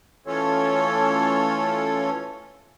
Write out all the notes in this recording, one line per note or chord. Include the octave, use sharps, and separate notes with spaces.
E3 A3 C#4 F4 A4 C#5